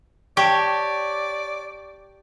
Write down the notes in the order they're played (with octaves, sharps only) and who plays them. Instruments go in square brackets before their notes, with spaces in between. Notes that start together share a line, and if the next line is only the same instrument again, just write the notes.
[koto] G4 [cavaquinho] C#5 [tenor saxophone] D5 [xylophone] G5 A5